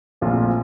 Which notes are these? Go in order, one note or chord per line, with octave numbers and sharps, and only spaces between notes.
A#1 A#2 A3 C4 F4